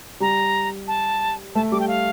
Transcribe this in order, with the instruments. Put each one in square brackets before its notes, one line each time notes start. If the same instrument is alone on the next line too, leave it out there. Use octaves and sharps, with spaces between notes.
[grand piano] G3 [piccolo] A#5
[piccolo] A5
[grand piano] A3 [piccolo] A5
[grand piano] G3 [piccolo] D6
[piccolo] G5
F5